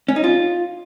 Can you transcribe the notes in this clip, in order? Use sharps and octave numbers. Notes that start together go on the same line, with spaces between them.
C#4
D#4
F4